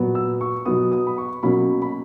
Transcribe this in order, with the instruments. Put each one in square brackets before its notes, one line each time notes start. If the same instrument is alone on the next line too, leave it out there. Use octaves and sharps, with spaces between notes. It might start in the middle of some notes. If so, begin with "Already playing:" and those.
Already playing: [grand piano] A#2 F#3 B3
E6
C#6
B2 F#3 B3 D#6
D#6
B5
C#6
B2 F#3 A#3 C#4 B5
B5